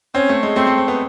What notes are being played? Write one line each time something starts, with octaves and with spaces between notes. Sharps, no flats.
C4 C#4
A3
G#3
A3 C4
A3
C4
B3